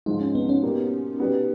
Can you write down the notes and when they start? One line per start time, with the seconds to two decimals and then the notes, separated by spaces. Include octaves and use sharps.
0.06 G#2 F3 G#3 D#4
0.21 C#4
0.35 B3
0.49 C#4
0.63 B2 G3 A#3
1.20 B2 G3 B3